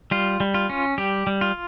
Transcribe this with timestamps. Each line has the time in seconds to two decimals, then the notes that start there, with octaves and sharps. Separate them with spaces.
0.11 G3 F4
0.40 G3
0.54 F4
0.70 C#4
0.98 G3 G4
1.27 G3
1.41 F4